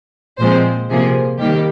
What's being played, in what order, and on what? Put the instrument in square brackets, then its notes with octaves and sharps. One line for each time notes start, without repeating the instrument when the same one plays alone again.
[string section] A#2 F3 G#3 C4 C5
C3 F3 A#3 G#4
D#3 G3 A#3 G4